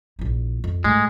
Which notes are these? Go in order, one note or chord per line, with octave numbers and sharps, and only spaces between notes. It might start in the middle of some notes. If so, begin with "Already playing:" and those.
A#1 E4
F2
A2 G#3